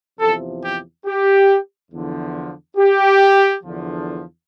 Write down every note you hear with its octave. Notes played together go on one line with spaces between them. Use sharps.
E2 C3 F3 A4
G4
G4
E2 D3 F3
G4
E2 D3 F3